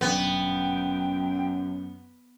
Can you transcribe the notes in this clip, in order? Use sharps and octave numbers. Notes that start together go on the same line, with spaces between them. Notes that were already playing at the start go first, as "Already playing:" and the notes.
G1 F#2 B2 B3 D4 G5